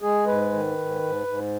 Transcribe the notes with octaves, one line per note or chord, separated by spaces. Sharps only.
G#3 G#4
G#2 B4
D#3
G#2
G#2
G#2